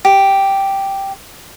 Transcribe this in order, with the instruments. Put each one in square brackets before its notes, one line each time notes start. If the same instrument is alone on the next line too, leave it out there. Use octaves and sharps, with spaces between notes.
[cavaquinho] G4